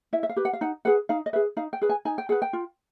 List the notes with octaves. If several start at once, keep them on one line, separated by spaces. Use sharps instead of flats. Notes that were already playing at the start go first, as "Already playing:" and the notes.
E4 E5
E5
F5
G4 B4
F#5
F5
D#4 F#5
G#4 B4 F#5
D#4 F5
D#5
G#4 B4 E5
D#4 F5
G5
G#4 B4
G#5
D#4 G#5
G5
G#4 B4 F#5
G5
F4